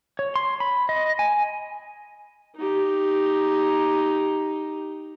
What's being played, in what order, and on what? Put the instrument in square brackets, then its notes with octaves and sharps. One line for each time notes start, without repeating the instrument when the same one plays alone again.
[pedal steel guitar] C#5
C6
B5
D#5
G#5
[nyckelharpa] D#4 G4